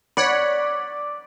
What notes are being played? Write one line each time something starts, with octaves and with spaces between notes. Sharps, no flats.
C#5 D5 F#5 B5